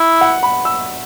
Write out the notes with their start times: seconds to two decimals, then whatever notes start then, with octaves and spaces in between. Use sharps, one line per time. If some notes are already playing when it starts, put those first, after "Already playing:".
Already playing: E4
0.21 F#5
0.43 B5
0.65 E6